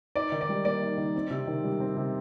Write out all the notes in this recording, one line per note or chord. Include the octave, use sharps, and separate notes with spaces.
D#4 D5
D#3
D5
G3
A#3 D5
D#4
D#3
C4
C3
D#3
G3
C4
C3